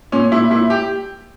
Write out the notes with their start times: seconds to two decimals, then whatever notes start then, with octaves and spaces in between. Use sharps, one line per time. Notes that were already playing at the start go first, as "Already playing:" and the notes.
0.12 A#2 C#4
0.31 A#2 E4
0.50 A#2 E4
0.70 G4